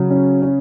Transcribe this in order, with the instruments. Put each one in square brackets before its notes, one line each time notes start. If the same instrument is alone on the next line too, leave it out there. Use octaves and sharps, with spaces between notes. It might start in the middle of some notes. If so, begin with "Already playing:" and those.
Already playing: [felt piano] C#3 [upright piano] F#3
[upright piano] C#4
C#4